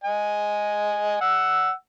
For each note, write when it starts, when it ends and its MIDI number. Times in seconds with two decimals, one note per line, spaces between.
0.04 1.20 75
0.04 1.20 80
1.21 1.71 78
1.21 1.71 88